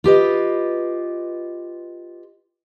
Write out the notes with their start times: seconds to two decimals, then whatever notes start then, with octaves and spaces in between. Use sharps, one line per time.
0.04 F4 G4 B4 D#5